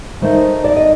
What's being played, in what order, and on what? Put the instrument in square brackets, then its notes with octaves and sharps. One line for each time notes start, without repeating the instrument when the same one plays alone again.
[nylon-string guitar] D#3 A3 D#4 C5
D5
D#5